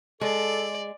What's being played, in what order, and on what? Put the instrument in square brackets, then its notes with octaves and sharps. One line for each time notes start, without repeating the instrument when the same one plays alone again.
[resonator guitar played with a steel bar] G#3 [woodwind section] A4 [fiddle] D5